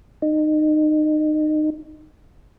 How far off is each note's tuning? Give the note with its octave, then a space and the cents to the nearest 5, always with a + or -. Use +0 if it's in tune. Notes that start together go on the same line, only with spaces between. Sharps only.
D#4 -25